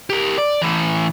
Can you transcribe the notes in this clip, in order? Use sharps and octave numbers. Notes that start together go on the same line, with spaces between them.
G4 A#4
D5
A2 E3